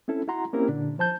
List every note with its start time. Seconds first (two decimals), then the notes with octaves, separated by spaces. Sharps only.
0.08 C4 C#4 E4 A4
0.28 E4 F#4 F#5 A#5 C6
0.53 A#3 C4 C#4 E4 G4 A#4
0.68 A#2 D3 D4
0.98 F3 C5 A5 G6